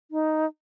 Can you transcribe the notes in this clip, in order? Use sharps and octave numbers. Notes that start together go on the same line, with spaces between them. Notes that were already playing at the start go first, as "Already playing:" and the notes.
D#4